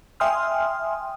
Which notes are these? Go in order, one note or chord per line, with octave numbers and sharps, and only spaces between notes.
E5 G5 G#5 C6 D#6 F6